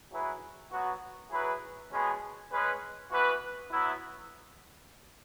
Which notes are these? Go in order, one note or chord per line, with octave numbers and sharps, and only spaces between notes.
F#3 E4 G#4 B4
F#3 B3 F#4
F#3 E4 G#4 B4
B2 G#3 C#4 G#4 B4
G#3 C#4 G#4 B4
E3 B3 F#4 B4
F#3 B3 E4